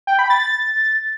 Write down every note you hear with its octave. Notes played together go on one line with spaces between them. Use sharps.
G5
B5
A6
A6